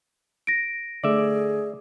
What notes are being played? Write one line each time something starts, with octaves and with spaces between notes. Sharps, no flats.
A#6 D7
D3 A3 G#4 D5 E5